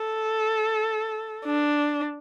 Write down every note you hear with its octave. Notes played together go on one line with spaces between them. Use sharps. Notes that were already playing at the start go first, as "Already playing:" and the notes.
Already playing: A4
D4